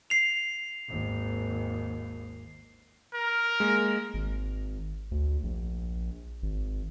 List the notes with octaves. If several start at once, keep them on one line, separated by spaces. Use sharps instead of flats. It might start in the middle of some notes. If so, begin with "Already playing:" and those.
C7 F7
G#1 D#2
A#4
G#3 A#3
G#1
D2
A#1
G#1